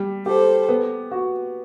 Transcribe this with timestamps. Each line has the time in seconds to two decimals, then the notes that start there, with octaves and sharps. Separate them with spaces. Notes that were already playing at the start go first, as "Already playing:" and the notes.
Already playing: G3
0.26 G4 A4 C5
0.69 B3
1.11 F#4